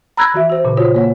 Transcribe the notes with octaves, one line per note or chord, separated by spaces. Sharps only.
A#5 B5 E6 F#6 G#6 A#6
E3 F#4 E5
F#4 C5
A#2 C#3
F4 F#4 C5 C#5
A#3 C#5 F#5